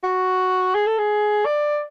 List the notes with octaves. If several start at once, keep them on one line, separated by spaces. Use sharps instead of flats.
F#4
G#4
A4
G#4
D5